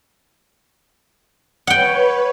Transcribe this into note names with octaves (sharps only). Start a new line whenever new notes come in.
B4 C#5 F#5 G5